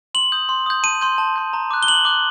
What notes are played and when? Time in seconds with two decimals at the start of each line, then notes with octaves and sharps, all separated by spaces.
0.14 C6 F#7
0.32 D#6 G6
0.49 C6
0.66 D#6 G6
0.83 A5 D#7
1.01 C6 G6
1.18 A5
1.36 C6 G6
1.53 A#5
1.71 D6 F#6
1.83 G7
1.87 A#5 F#7
2.05 D6 F#6